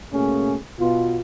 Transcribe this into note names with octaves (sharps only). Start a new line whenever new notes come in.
B2 A3 A#3 C#4 G#4
B2 B3 F4